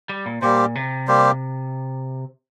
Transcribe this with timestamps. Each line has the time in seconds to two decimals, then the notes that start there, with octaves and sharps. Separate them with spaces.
0.09 G3
0.26 A#2
0.42 A#2 G3 A#3 G4 C5
0.75 C3
1.08 G3 A#3 G4 C5